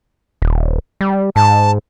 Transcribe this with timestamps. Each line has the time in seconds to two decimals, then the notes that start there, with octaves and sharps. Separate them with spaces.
0.42 D#1
1.01 G3
1.36 G#2 A5